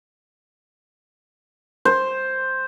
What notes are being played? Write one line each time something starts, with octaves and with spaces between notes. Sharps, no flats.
C5